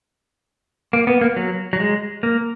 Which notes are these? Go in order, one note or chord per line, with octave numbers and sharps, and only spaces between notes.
A#3
B3
A#3
F#3
F#3
G#3
A#3